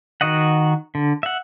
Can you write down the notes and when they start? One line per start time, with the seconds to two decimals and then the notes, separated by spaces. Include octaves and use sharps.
0.21 D#3 F#4 D#5 F#5
0.95 D3
1.23 E5 F#5